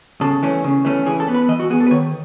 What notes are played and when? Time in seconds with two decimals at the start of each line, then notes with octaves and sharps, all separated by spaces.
0.21 C#3 A4
0.43 E3 A3 C#4
0.64 C#3
0.85 E3 A3 C#4
1.06 E3 G#4
1.20 A4
1.28 B3
1.34 B4
1.49 E3 D#5
1.60 F#4
1.70 B3 G#4
1.80 A4
1.87 B4
1.91 D#3 C#5